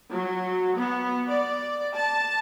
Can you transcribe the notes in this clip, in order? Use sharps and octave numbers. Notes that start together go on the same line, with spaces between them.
F#3
B3
D5
A5